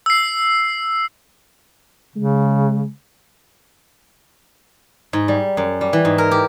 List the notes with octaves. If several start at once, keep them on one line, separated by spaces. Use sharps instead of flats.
E6 C7
C#3 G#3
G#2
G3
F#2
G3
E3
G#2
A#4
G4